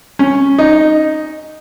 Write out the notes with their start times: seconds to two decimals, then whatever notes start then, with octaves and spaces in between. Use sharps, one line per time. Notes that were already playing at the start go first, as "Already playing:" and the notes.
0.19 C#4
0.58 D#4